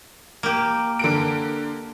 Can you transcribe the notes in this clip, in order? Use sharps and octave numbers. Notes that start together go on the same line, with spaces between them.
A#3 G4
D3 A#4 D7